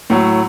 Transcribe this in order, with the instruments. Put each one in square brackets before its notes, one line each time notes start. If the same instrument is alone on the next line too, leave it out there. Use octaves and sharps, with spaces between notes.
[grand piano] A2 F#3